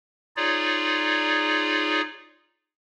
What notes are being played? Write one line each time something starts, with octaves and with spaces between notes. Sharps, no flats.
D#4 F4 G#4 C#5 D5